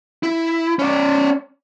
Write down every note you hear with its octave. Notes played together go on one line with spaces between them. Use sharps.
E4
C#4 D5